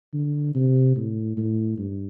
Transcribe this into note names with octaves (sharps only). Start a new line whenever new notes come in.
D3
C3
A2
A2
G2